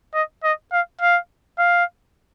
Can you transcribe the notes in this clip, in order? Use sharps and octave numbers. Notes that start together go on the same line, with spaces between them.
D#5
D#5
F5
F5
F5